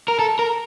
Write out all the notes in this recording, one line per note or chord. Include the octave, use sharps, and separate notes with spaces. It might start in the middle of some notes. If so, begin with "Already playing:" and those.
A#4
A4
A#4